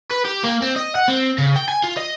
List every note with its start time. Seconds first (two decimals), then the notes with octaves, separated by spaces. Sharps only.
0.11 B4
0.25 G4
0.44 A#3
0.62 C4
0.76 D#5
0.95 F#5
1.08 C4
1.38 C#3
1.56 G5
1.68 G#5
1.83 F4
1.97 D#5